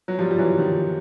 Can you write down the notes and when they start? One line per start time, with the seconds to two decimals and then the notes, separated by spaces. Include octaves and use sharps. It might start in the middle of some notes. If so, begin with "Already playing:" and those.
0.08 F#3
0.19 F3 G3
0.31 G3
0.38 E3 F#3
0.58 D#3 F3